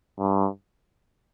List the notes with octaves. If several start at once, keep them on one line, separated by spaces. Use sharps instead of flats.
G2